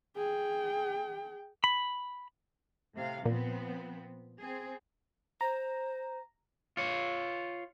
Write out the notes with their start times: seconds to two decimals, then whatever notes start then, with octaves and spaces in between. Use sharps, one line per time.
0.17 G#4 G5
1.64 B5
2.93 A2 C3 F5
3.25 A#2 F3 B3 C4
4.39 C4 G#4
5.41 C5 A#5
6.77 F4 C#5